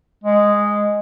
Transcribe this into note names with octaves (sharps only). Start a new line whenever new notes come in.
G#3